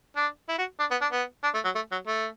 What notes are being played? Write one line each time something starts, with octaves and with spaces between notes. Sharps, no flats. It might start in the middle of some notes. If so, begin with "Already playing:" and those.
D4
E4
F#4
D4
B3
D4
B3
D4
A3
F#3
A3
F#3
A3